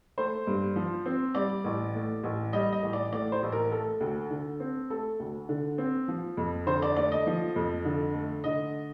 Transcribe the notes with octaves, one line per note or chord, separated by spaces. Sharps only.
A3 C5
G2
F3
C4
G3 D5
A1
A2
A1
G3 D#5
D#5
A1
D5
A2 D5
C5
A1
A#4
A3 A4
D2
D3
C4
A3 A4
D2
D3
C4
F3
F2
D3 C5
D5
A3 D5
D#5
F3
F2
D3
A3
D3 D#5